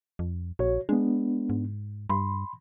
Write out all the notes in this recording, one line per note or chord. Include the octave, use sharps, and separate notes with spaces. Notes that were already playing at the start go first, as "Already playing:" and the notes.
F2
A#1 F#4 C#5
G#3 B3 D4
G#2
G2 B5 C6